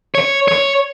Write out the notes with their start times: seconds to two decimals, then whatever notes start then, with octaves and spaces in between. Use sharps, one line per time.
0.15 C#5
0.48 C#5